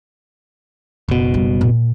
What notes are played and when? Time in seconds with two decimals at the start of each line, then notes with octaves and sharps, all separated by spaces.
1.09 F#1 B2
1.34 G3
1.61 A#2